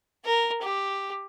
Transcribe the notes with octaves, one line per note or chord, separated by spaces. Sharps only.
A#4
G4